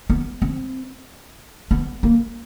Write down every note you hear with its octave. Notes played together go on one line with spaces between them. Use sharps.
B3
C4
B3
A#3